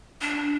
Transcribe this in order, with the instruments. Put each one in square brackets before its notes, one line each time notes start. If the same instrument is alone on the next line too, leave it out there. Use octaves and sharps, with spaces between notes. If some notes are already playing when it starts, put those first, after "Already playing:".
[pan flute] D4